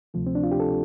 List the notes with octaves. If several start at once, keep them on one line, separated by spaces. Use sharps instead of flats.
D2 C3 F3 A3
C4
D4
F4
G4
A4